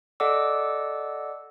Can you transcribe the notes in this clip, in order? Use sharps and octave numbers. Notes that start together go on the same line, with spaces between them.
A4 D5 D#5 F#5 D6 E6